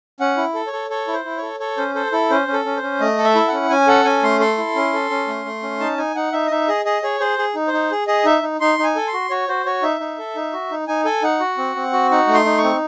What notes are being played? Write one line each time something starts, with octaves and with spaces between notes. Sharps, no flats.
C#4 F#5
E4
A4
C#5
A4
A4 C#5
E4
C5
E4
A4 C#5
A4 C#5
C#4 C5
A4 C5
E4 A4
C#4 C5
C#4
A4
C#4
C5
C#4
A3 D#5
A4
E5
E4
F#5
C#4
C#4 G#5
A4 F#5
C#4 G#5
A3 C6
A4 C6
E4
C#4
A4
C#4
A3
A3
C#4
D#4 A5
D#4 G#5
D#4 F#5
D#4 E5
D#5
D#4 E5
G#4 D#5
G#4 D#5
G#4 C#5
G#4 C5
G#4
D#4
C5
D#4
G#4
G#4 D#5
D#4 E5
D#4
D#4 C6
D#4 G#5
A4
C6
F#4
F#4 C#5
F#4 C5
F#4 C#5
D#4 E5
D#4
A4
D#4
F#4
D#4
D#4 G#5
A4 G#5
D#4 F#5
F#4
C4
C4
F#4
D#4 F#5
A3
C6
D#4
C#6
C4